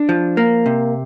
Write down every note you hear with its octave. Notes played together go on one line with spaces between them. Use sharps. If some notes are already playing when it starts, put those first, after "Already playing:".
Already playing: D4
F3
A#3
C3